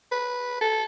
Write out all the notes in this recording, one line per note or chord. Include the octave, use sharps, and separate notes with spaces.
B4
A4